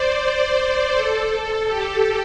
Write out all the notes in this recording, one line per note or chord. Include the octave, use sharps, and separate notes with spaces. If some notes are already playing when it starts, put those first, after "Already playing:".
Already playing: C5 D5
C5
A4
G4